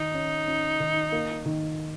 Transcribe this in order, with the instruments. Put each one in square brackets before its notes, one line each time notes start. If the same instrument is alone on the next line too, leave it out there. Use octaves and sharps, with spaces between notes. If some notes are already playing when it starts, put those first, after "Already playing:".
Already playing: [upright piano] D#3 [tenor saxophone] D#4
[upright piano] C#4
C#4
D#3
A#3
D#3